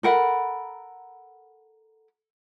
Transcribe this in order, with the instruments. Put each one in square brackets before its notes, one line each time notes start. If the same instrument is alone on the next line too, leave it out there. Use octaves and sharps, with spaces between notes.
[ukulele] A4 A#4 F#5 B5